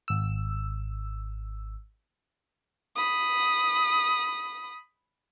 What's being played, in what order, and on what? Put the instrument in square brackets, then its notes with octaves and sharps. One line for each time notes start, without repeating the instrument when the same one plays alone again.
[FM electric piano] G#1 E6
[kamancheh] B5 D#6